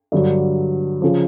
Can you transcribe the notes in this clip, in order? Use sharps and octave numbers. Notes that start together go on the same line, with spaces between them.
G2 D3 F#3
C#3 F3